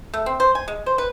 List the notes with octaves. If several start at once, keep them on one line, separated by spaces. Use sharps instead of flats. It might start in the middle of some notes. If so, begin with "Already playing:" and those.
A3
C4
C5
G#5
G#3
C5
B4